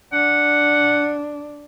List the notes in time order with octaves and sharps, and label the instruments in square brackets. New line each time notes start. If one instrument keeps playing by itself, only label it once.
[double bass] D4 [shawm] F#5